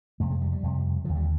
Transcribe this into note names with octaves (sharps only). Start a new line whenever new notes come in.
F2 C3 A3
G#3
G3
G3
F2 C3
D#2 D3 F3
G3